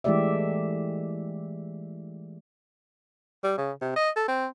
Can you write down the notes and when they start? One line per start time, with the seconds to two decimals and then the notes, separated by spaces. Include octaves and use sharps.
0.04 E3 G#3 A3 G4 D5 E5
3.43 G3
3.57 C#3
3.81 C3
3.96 D#5
4.16 A4
4.28 C4